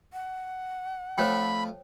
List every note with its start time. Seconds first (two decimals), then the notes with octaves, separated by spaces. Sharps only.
0.13 F#5
1.18 F2 F3 A3 C5 C#5 G5 B5